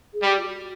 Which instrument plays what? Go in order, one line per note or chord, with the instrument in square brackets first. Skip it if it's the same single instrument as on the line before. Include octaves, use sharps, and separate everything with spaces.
[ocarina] G#4
[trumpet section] G3 [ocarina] G4
[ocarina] F4
F#4